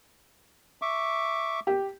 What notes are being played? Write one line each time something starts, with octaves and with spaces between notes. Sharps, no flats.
E5 C#6 D6
G4